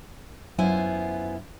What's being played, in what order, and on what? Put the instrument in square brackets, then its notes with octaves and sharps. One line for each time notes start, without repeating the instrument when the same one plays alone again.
[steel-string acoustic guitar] F#2 B3 E4 F4 C5 G#5